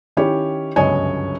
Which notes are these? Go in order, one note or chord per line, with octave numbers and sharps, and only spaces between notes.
D#3 C#4 E4 G4 C#5
G1 C#2 F#2 C#5 D#5 G#5